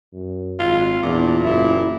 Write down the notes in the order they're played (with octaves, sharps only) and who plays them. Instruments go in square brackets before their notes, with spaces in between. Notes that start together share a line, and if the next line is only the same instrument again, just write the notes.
[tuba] F#2
[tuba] G#1 [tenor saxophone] F4
[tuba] E2 [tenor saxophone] A#2 [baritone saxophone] D4
[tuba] F#1 [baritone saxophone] E4